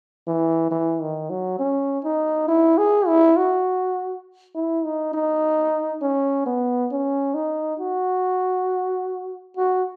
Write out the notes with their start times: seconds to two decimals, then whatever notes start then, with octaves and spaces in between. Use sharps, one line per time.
0.27 E3
0.71 E3
1.01 D#3
1.30 F#3
1.59 C#4
2.04 D#4
2.48 E4
2.78 G#4
3.07 E4
3.37 F#4
4.55 E4
4.84 D#4
5.14 D#4
6.02 C#4
6.46 B3
6.91 C#4
7.35 D#4
7.80 F#4
9.57 F#4